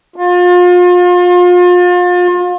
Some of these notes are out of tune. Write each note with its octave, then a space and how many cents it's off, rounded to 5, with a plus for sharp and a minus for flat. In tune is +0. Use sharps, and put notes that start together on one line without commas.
F4 +35